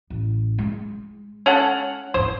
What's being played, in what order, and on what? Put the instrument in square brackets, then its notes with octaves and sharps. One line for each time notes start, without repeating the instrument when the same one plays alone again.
[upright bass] A1
G#3
[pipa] C#4 A4 F#5
[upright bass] G#1 D#2 [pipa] C5